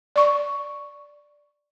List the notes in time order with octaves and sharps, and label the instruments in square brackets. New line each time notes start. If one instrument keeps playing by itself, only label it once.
[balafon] D5 C#6